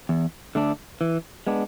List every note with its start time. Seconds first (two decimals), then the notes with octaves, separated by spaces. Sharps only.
0.09 E2
0.55 D3 A3 D4
1.01 E3
1.47 G#3 B3 D4